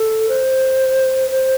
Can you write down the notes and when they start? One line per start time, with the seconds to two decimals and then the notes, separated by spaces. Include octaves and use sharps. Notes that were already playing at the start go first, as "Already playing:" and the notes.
Already playing: A4
0.29 C5
1.31 C5